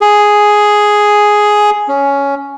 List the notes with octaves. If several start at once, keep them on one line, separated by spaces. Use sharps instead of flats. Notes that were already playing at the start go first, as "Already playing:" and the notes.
G#4
C#4